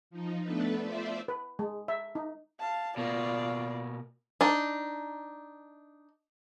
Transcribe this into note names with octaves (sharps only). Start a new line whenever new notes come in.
F3 D#4
A3 B3 D4 A4 B4
F4 C5 D5 E5
B4
G#3
E5
D#4
F5 A5
B2 A#3 F4 D5
D4 D#4